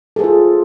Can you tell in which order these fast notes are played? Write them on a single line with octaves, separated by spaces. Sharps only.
A4 G#4 C5 F4